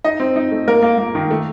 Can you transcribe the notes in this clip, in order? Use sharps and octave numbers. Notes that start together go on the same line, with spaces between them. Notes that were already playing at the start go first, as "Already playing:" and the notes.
D#4 D#5
C4
D#4
A3
A#3 A#4
A#3
A#3
D#3
A3